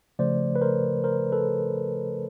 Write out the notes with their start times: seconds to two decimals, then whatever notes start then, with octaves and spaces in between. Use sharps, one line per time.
0.19 C#3 F3 A3 C5 D5
0.56 B4
0.61 A#4 C5
1.04 A#4 C5
1.32 A4 B4